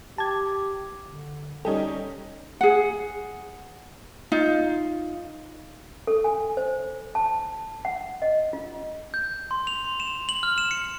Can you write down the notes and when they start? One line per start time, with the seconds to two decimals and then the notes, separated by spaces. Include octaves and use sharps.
0.18 G4 A5 G#6
1.06 D3
1.65 G3 C#4 D#4 G4 A4
2.61 G#4 F#5
4.32 D#4 F4
6.07 A4
6.24 G#5
6.57 C5
7.15 A5
7.85 F#5
8.22 D#5
8.53 F4
9.14 G6
9.51 C6
9.67 F7
9.84 C6
10.00 E7
10.29 F#7
10.43 F6
10.58 E7
10.71 C#7